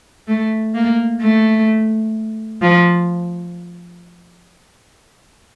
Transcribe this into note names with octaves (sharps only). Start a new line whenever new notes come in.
A3
A#3
A3
F3